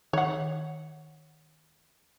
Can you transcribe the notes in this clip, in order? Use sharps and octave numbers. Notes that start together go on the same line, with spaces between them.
D#3 C#5 F#5